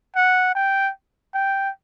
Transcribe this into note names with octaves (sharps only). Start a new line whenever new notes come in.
F#5
G5
G5